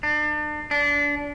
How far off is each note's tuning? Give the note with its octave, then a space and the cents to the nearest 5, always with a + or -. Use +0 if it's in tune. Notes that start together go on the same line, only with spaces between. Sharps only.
D4 +35
D4 -25